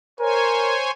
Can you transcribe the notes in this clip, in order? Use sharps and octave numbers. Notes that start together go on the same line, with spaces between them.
A#4 C5 C#5 G#5